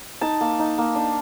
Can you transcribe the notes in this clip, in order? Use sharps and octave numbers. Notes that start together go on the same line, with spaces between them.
D#4 A5
A#3
D#4
A#3
D4